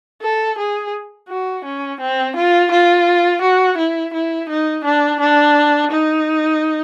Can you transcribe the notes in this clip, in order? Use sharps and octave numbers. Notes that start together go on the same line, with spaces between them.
A4
G#4
F#4
C#4
C4
F4
F4
F#4
E4
E4
D#4
D4
D4
D#4